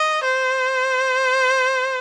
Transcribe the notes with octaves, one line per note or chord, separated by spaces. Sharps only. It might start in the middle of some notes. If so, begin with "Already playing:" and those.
Already playing: D#5
C5